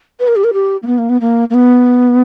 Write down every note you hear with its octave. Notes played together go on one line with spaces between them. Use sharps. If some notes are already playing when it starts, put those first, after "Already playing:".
B4
A#4
G4
A#4
G4
A#3
B3
A#3
B3
A#3
A#3
B3